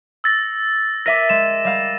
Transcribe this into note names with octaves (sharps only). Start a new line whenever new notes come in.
E6 A6 A#6
A#4 E5 D6 A#6 D#7
G#3 E7
G3 F5